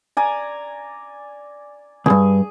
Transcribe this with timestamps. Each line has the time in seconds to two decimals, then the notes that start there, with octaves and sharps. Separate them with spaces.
0.17 D5 G#5 A#5
2.06 C#2 G2 G#4